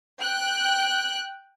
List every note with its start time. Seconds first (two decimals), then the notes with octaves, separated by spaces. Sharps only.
0.20 G5 F#6